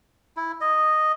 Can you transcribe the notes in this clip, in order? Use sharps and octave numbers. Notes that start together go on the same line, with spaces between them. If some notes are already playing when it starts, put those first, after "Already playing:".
E4
D#5